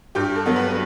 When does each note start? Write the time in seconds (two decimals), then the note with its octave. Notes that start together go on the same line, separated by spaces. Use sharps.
0.15 G2 G4
0.35 A4
0.46 F#3 B3
0.56 B4